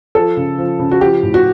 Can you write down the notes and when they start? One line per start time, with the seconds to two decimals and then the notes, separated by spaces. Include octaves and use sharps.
0.15 F3 A4
0.37 C#3
0.58 F3
0.79 C#3
0.91 F#4
1.01 F3 G4
1.23 A2
1.34 F#4